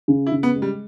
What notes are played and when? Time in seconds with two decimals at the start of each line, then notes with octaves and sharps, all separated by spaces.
0.08 C#3
0.27 E4
0.32 C#3
0.43 B3
0.55 G#3
0.62 G3